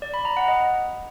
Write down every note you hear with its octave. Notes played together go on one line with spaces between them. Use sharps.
D5
B5
A#5
F#5
D#5